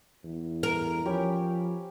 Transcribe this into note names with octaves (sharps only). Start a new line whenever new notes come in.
E2
A#4 A#5
F3 C#4 G4 B5